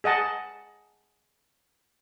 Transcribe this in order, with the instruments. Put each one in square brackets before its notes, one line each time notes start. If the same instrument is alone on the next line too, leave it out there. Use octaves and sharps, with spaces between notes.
[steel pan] G#4 D#5 F#5 A5